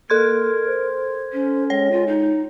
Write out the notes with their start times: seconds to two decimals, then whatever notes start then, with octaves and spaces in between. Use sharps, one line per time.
0.10 A#3 A4 A#4 C6 G#6
0.66 C5
1.33 C#4
1.70 G#3 C#5
1.91 F4
2.07 D#4